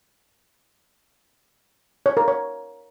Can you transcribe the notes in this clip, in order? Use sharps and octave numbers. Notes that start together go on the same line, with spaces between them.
C#5
A#4
C#5